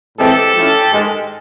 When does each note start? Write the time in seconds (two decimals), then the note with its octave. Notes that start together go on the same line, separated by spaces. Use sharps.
0.18 A2 E3 G#3 C4 G4 A4
0.55 F3 A3 C#4 E4
0.92 G#2 D#3 G#3